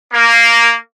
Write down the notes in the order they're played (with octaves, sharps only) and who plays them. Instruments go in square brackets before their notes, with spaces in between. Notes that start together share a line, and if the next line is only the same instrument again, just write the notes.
[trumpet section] A#3